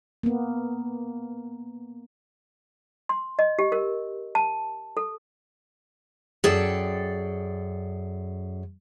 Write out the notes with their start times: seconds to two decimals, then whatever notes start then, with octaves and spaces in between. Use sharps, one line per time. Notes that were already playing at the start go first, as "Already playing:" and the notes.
0.23 A#3 B3
3.09 C6
3.39 D#5
3.59 G4
3.72 A#4
4.35 A5
4.97 A4
6.44 F#2 G#4 A4 D5 G5